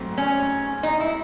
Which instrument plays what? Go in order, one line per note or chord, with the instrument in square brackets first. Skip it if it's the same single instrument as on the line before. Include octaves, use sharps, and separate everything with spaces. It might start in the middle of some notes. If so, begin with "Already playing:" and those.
Already playing: [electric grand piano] G#2 F#3 A3 C4
[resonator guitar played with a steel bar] C#4
D#4
E4